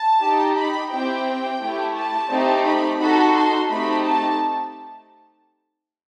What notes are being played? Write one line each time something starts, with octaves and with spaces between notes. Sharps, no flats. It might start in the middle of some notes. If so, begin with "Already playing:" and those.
Already playing: A5
D#4 G4
B5
C4 E4 G4 G5
A3 E4 G4
A5
A3 C4 D#4 G4
B5
D#4 F#4 A4 B5
C6
A3 C4 D#4 G4 B5
A5